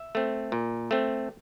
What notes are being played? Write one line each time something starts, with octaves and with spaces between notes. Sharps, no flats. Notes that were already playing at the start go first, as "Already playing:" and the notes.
Already playing: E5
A3 C4
A#2
A3 C4